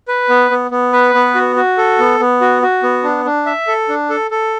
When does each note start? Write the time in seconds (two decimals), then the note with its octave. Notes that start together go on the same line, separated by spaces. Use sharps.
0.08 B4
0.29 B3
0.51 B3
0.71 B3
0.93 B4
1.14 B3
1.35 F#4
1.56 F#4
1.77 A4
1.99 B3
2.20 B3
2.41 F#4
2.62 F#4
2.83 B3
3.03 D4
3.25 D4
3.46 E5
3.67 A4
3.89 D4
4.10 A4
4.31 A4